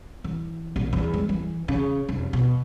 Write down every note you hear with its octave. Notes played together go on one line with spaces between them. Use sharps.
E3
A#1
E2
G#3
E3
C#3
F1
B2